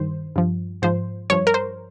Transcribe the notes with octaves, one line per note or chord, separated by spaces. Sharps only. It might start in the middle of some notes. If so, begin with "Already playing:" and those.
Already playing: G2 D#3 C5
G2 F3
G#2 F3 C5
G2 F3 C#5
A#4
C5